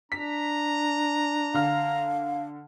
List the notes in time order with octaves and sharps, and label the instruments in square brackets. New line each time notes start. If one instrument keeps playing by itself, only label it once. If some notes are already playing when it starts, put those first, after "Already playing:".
[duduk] D4 [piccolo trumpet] A#5 [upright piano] B6
[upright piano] D3 F6 [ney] F5